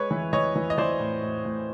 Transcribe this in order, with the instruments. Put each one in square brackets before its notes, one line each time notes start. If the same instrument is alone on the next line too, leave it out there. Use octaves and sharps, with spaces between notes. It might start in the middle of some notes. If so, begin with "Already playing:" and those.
Already playing: [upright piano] G#3 B4 C#5
E3
E3 C#5 D#5
E3
D#5
E3 C5 D5
A2
A2
A2